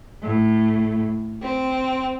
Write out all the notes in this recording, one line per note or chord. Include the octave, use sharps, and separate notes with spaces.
A2
C4